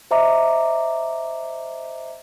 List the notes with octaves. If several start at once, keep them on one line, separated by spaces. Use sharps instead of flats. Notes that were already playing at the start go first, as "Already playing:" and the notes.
C5 D#5 E5 A#5 D6